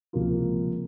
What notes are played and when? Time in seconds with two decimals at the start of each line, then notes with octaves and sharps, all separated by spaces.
0.13 C#2 C3 F3 A#3 F4